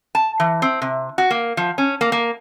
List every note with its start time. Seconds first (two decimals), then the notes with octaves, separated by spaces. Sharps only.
0.15 A5
0.40 E3
0.62 C4
0.82 C3
1.18 F#4
1.31 A#3
1.57 F3
1.78 C#4
2.01 A#3
2.12 A#3